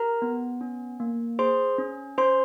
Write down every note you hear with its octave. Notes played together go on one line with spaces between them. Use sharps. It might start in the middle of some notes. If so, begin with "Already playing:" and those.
Already playing: G4 A#4 A#5
B3
C#4
A#3
G#4 C5 C6
C#4
C#4 C5 C6